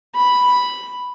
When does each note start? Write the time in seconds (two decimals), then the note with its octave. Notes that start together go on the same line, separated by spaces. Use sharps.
0.15 B5